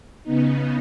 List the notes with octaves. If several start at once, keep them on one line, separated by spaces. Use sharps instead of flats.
C#3 B3 D#4